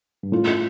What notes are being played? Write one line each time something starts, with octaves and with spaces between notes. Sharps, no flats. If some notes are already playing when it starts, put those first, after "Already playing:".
G2
A2 F4